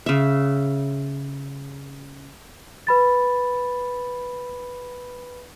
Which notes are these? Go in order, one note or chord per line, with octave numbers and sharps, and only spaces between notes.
C#3 E5
B4 B5 A6